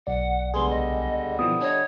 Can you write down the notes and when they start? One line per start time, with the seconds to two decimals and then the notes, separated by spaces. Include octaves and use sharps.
0.07 B1 D5 F#5
0.54 C#2 D3 G3 B3 G#4 C6
0.70 D#5
1.39 B2 E3 F3 D#6
1.61 D4 C#5 D#5